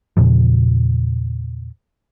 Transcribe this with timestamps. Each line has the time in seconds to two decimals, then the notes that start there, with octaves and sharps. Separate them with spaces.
0.17 E2 A#2 C#3 F3